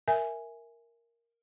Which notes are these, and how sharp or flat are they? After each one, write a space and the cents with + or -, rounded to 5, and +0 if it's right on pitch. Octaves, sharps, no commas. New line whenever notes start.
A#4 +0 E5 +0 G#5 +0